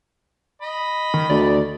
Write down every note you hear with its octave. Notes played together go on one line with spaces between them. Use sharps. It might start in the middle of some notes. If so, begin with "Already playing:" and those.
D#5 B5
D#3
D2 D5